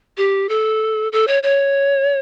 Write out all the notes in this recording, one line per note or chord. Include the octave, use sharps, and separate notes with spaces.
G4
A4
A4
C#5
C#5